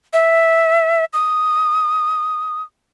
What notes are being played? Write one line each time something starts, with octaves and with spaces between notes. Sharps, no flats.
E5
D#6